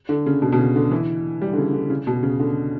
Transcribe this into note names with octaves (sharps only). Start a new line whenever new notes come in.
D3
C#3
B2
B2
C#3
D3
E3
G3
D3
C#3
D3
C#3
B2
C#3
D3